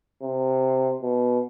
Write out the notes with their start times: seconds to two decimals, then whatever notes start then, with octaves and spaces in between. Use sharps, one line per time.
0.22 C3
1.03 B2